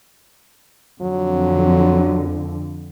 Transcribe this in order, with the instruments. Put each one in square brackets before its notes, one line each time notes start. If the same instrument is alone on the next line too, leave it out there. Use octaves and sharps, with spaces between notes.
[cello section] F2 D3 [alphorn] F#3